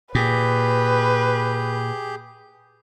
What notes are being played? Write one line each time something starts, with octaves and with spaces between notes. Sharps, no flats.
A#2 G4 G#4 B4 G6